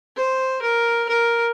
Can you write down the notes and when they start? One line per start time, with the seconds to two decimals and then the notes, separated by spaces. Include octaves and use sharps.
0.16 C5
0.62 A#4
1.09 A#4